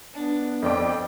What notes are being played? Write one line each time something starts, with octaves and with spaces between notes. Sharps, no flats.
B3 D4
F2 D5 G5 D6